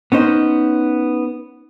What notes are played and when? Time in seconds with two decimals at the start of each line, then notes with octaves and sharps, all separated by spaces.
0.12 B3 C#4 D#4 C5